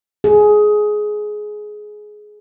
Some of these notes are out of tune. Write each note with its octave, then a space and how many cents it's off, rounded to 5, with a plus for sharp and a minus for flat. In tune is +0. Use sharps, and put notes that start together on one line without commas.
G#4 +15